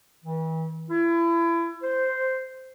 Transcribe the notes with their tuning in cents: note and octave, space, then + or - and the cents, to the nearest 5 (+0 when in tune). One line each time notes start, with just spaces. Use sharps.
E3 -35
E4 +30
C5 -5